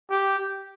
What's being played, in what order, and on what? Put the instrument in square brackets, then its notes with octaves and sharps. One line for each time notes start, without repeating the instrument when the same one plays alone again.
[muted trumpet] G4